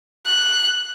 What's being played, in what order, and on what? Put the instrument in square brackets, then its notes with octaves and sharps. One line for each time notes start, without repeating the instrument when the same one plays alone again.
[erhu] F#6